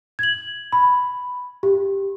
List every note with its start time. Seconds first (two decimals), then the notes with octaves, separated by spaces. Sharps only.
0.19 G#6 F#7
0.72 B5
1.63 G4